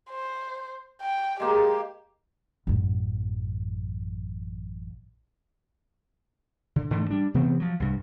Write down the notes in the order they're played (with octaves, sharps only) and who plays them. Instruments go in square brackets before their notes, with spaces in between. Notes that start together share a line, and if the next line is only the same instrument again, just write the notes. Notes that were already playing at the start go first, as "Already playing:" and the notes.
[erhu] C5
G5
[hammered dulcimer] G#3 A#3 [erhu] G4
[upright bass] A1 F#2
[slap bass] D3
G#2 D3 E3 A3
G3 D4
C3 E3 B3 C4
F3 F#3
C2 G2